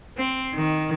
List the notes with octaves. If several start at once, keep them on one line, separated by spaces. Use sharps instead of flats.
C4
D#3